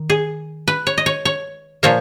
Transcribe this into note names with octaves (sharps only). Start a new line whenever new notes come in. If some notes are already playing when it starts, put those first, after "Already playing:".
Already playing: D#3
G#4
B4
C#5
D#5
C#5
C#5
A#2 F3 A#3 C#5